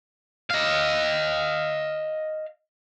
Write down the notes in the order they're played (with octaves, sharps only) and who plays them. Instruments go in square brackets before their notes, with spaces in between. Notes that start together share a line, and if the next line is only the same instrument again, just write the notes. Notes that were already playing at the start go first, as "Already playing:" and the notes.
[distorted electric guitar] D#5 F5